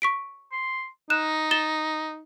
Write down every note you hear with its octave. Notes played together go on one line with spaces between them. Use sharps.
C#6 B6 D7
C6
D#4 F#6 E7
A6 E7 G7